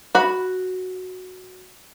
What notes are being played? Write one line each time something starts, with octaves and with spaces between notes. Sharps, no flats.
F#4 B5